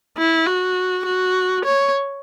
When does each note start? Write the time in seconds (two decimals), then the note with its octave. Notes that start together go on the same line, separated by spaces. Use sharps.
0.17 E4
0.47 F#4
1.05 F#4
1.65 C#5